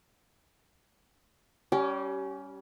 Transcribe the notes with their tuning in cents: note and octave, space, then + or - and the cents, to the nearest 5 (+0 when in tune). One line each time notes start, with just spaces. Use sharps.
G3 -15 C#4 +15 G4 -25